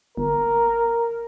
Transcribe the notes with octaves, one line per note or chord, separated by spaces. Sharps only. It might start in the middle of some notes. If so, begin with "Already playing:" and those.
G1 A#4